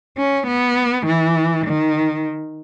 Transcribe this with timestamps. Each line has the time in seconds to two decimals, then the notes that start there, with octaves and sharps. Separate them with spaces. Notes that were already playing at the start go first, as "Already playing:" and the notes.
0.18 C#4
0.48 B3
1.07 E3
1.67 D#3